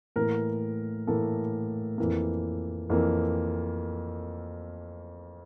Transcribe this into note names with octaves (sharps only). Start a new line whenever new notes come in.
A2 E3 A#3 A#4
A2 E3 A#3 A4
F2 E3 A#3
F2 E3 A#3